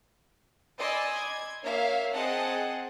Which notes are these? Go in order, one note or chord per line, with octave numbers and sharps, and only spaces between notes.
D5 D#5 G#5 B5 C6 E6
G#6
A#3 C#5 E5 F5
C4 G#4 D#5 F#5 A5